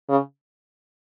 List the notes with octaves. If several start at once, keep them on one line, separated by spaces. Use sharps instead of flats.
C#3